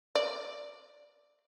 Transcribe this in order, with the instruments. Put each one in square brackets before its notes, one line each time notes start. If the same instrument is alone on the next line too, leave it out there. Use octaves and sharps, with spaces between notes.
[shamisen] D5